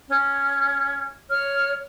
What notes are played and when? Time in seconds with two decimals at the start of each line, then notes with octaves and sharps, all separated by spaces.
0.08 C#4
1.30 C#5 F6